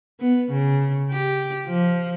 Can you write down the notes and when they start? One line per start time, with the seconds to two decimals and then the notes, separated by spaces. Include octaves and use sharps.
0.20 B3
0.51 C#3
1.10 G4
1.67 F3